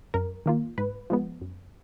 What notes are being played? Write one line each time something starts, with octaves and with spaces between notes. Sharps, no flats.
F#2 A#4
D#3 A#3 F4
G#2 B4
F3 G#3 B3
F#2